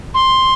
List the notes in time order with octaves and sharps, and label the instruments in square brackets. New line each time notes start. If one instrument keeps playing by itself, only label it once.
[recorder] C6